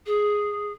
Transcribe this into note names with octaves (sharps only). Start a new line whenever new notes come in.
G#4